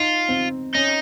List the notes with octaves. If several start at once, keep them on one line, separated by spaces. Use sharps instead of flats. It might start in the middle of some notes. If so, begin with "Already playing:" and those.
Already playing: D#4 F4
C4
C#4 D#4